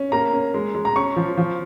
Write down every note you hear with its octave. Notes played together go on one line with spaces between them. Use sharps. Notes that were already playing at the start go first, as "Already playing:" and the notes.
Already playing: C#4
A#3 A#5
C#4
G#3
G#3
A#5
C#4 C#6
F3
F3